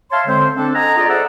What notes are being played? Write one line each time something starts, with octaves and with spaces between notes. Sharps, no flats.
C#5 E5 F5 A5 C6
D3 G#3 C4 C5
C4 D4 A4
A4 D#5 F#5 G#5 A#5
F4 G#4 D5 D#5
A4 C5 D5 E5 F#5